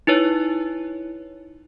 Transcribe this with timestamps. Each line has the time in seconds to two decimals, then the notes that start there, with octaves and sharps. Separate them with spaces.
0.07 D#4 E4 B4 C#5